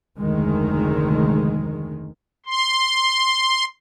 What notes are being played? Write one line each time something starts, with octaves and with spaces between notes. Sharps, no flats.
F1 D2 D#3 G#3
C6